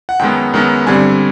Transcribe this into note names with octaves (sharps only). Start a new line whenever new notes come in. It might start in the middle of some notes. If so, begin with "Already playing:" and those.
F#5
F#2 D#3 G#3 B3 G5
F#2 D#3 G#3 B3
G2 D3 G3 C4 G#5